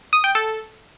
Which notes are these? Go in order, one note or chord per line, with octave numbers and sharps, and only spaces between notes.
D#6
G5
A4